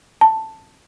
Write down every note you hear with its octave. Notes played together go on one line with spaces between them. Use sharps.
A5